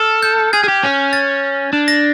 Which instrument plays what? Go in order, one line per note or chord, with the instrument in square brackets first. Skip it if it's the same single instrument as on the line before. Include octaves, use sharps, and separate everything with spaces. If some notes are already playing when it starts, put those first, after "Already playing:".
Already playing: [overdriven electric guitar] A4 [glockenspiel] F6
[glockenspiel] G6
[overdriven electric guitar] G#4 [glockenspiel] G#6
[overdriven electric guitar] G#4
G4
C#4
[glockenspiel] A6
[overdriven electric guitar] D4
[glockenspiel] A#6